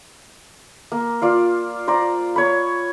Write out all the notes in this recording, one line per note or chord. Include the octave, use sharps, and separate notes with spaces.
A#3
F4 D5 F5
C5 D5 A#5
C#5 B5